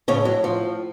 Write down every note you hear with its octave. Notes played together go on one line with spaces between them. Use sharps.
A2 C#3 C#4
F#3
F3